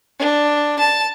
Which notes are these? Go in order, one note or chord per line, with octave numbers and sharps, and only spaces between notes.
D4
A5